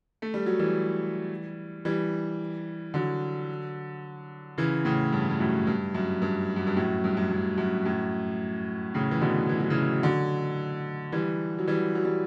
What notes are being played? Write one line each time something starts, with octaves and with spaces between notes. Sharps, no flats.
A3
G3
F#3
E3 G3
E3 G3
D3 F#3
C#3 E3
A2 C#3
G2
G2
F#2 A2
G2
F#2
G2
F#2
G2
F#2 A2
G2
F#2
F#2
F#2
F#2 A2
A2 C#3
E3
B2 D3
E3
F#3
C#3 E3
D3 F#3
E3 G3
F#3
E3 G3
F#3
G3